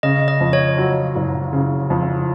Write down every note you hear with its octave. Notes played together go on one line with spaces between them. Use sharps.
C#3 D#5
D#5
F2
C#5
F#3
F#1
C#3
F2